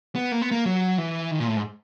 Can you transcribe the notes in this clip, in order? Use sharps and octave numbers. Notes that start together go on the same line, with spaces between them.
B3
A#3
B3
A#3
F#3
E3
D#3
A#2
A2
G#2